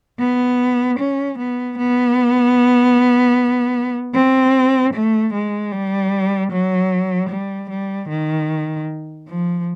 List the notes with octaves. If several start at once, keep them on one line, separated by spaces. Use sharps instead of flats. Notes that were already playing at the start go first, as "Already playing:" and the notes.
B3
C#4
B3
B3
C4
A3
G#3
G3
F#3
G3
G3
D#3
F3